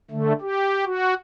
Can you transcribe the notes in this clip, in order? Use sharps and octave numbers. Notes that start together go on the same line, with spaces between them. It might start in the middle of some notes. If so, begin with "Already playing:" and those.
D3 A3
G4
F#4